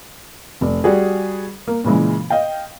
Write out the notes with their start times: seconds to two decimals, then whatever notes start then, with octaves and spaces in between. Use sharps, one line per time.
0.61 F1 D5
0.84 G3 F#4 G#4
1.68 A#3
1.84 A#2 C#3 E3 G#3
2.30 D#5 F5 G5